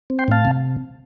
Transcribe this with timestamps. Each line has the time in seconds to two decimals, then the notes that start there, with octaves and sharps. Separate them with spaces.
0.10 C4
0.19 G5 C6
0.28 A2 F5 A5
0.45 C3